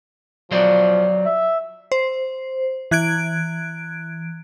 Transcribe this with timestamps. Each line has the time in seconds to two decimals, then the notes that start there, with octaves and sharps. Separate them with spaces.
0.51 F3 F#3 C5 D5
1.25 E5
1.92 C5
2.91 E3 F#6 G#6 D7